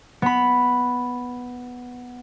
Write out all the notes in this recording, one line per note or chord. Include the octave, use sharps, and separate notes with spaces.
B3 B5